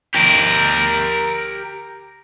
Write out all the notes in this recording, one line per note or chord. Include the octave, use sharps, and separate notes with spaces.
G4 A#4